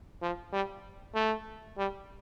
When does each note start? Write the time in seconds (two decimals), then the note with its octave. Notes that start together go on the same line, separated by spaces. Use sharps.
0.22 F3
0.53 G3
1.15 A3
1.78 G3